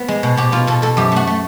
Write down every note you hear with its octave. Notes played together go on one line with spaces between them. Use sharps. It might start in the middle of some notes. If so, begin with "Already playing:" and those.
Already playing: B3
G#3
B2
B2 G4
B2 F4
B2 A4
B2 A4
F#2 G4
A3 F#4
A3